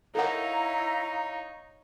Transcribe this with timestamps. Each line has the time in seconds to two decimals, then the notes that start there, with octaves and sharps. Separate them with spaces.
0.15 D#4 E4 A4 A#4 C#5 F5 F#5 A#5